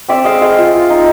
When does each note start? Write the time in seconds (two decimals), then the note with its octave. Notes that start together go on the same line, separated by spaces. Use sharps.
0.09 C4 D5 E5
0.25 G#3 D#5 F5
0.41 G#3 D#5 F5
0.58 F4
0.74 F4
0.90 D#4